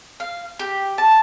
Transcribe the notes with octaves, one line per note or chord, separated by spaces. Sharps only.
F5
G4
A5